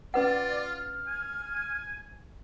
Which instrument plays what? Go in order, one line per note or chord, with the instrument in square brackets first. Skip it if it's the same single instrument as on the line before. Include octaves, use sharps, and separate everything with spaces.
[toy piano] C#4 B4 F#5 [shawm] F4 [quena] D5
[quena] F6
[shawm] G#5